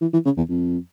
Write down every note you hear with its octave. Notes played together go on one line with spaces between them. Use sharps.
E3
E3
C#3
E2
F2